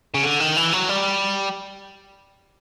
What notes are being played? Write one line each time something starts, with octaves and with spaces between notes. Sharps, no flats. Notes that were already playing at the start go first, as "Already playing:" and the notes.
C#3
D3
D#3
E3
F#3
G3